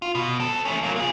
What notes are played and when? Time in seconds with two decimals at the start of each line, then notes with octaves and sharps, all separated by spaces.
0.02 F4
0.15 B2
0.40 C4 A4
0.65 A3 C#4
0.83 F#3 A#3
0.96 F4 G#4